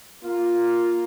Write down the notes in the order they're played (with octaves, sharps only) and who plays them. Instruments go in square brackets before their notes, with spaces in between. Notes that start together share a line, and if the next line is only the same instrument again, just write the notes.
[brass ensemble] A#3 F4